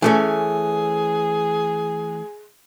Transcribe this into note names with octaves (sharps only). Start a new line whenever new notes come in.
E3 A3 C#4 G#4